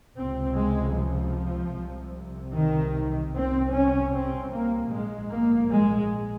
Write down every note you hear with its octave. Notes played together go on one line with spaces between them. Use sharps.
C#2 C3 C4
G#3
F3
C2 C3
D#3
C2 C3 C4
C#4
C4
A#3
A#1 G#2 G#3
A#3
G#3